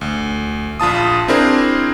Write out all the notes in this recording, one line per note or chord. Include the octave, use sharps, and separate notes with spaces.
D2
A#1 F4 A5 D#6
C4 D4 E4 G#4 A#4 C5